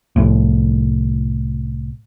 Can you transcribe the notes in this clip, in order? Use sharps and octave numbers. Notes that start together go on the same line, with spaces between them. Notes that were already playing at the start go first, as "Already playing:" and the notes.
C2 A2